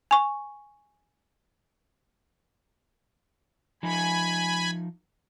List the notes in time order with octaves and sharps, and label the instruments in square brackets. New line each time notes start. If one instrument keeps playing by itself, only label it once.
[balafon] G#5 C#6
[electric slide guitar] F3 D#4 [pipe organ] G#5 B5